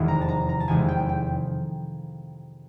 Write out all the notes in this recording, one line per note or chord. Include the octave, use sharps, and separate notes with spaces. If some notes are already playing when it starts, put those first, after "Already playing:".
Already playing: F1 E2 C3 D#3 G#3
A#5
A5
A#5
A#5
A5
F1 E2 C3 D#3 G#3 G#5
G5
G5